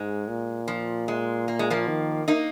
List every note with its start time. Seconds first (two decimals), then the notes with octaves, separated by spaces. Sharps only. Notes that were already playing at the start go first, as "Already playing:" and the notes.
Already playing: G#2 G#3
0.28 A#2
0.68 F3
1.08 G#3
1.48 A#3
1.59 G#3
1.70 F3 A#3
1.88 D#3
2.28 A#3 D#4